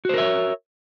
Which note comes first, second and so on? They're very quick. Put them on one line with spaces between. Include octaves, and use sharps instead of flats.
F#4 C5 A#4 E5 C#5